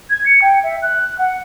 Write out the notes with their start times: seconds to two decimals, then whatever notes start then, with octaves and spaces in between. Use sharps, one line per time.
0.10 G#6
0.26 C#7
0.42 G5
0.63 E5
0.82 F#6
1.19 F#5